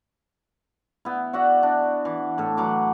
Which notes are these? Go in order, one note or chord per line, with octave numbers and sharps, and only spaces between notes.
B3 E4
F#4 D5 E5 F#5
D4
E3
A2 A4
E3 F#3 D6